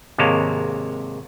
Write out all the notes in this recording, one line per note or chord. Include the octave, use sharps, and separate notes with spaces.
G#1 C3 G#3 A#3 C#5 A5